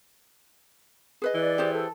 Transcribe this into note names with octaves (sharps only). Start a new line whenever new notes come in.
G#4 B4 D#5
E3 D5
G4 G#4 C5
A4